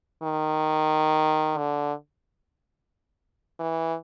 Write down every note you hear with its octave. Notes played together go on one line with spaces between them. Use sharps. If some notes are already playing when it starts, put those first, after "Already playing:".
D#3
D3
E3